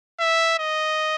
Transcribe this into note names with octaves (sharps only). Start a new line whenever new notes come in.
E5
D#5